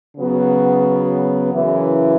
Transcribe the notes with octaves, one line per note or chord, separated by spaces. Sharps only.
C#3 F#3 B3 F#4
F#2 C#3 E3